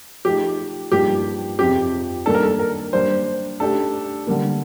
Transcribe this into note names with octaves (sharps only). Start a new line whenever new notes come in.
F3 A3 D#4 G4
G2 F3 A#3 D#4 G4 A#4
F2 C3 F3 C4 G4
D#3 G3 A#3 D4 A4
A#4
A4
A#4
G3 A#3 D4 C5
A3 D4 G4 A4 D5
D3 G3 A#3